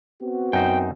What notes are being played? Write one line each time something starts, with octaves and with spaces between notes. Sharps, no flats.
B3 C4 F#4
F#2 D#4 C5 G5